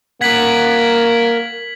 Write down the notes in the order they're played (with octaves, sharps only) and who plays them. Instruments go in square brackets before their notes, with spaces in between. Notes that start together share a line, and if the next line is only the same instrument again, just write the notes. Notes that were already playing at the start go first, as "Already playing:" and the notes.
[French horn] A#3 [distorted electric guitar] A#4 F#5 [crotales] G#6 B6 F#7